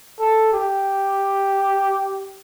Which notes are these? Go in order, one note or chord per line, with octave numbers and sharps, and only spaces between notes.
A4
G4